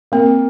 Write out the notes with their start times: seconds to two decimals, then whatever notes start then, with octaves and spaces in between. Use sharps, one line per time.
0.12 A#3 C4